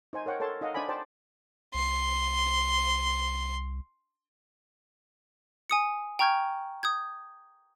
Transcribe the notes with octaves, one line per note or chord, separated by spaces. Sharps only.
D#4 C5 G#5
A#4 C#5 F#5 G5
A4 A#4 C#5 A5 C6
D#4 D#5 F5 F#5
D4 C5 D5 G#5 B5
C5 D5 G5 A5
C2 C6
G#5 D#6 C#7
G5 A#5 C#6 F6 G6 G#6
D#6 G6 G#6